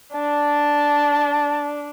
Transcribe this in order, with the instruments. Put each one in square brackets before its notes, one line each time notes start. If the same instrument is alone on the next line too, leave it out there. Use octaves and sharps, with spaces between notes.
[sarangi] D4 [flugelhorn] A5